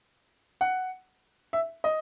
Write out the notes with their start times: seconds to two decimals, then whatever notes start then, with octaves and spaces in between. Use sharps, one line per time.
0.61 F#5
1.53 E5
1.84 D#5